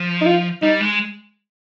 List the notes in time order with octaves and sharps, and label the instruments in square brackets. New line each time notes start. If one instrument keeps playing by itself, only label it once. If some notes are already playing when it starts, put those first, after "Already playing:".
Already playing: [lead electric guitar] F3
[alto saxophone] D#4
F4
[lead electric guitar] G3 [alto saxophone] D#4
[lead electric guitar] G#3